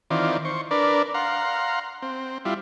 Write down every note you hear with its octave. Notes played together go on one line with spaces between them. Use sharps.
D#3 E3 C4 F4 D5
C5 C#6
D4 A#4 B4 D5
F5 F#5 A#5 C6
C4
G3 E4 F4